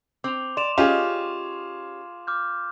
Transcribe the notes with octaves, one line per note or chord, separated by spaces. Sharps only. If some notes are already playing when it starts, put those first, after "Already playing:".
C4 D6 F7
D5 C6 E7 F7
C#4 F4 G4 G#4 D#5
D6 F6 G6